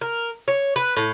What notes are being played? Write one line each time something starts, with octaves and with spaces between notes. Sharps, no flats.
A#4
C#5
B4
A2